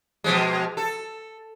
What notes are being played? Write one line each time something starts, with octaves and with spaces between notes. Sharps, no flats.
B2 F3 G#3
A4